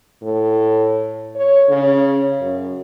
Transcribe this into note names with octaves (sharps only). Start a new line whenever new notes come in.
A2
C#5
C#3
F#2